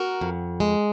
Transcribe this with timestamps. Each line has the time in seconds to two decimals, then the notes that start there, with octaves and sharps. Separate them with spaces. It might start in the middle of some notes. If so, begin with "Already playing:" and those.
Already playing: F#4 A#4
0.21 F2
0.60 G#3